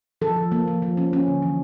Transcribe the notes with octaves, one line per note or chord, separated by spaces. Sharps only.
F3 A4
F3
A#3
F3
F3
C#4
C#4
D3
E3